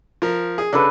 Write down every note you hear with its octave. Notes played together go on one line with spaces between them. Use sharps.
F3 A#4
G#4
C#3 D4 A4 B4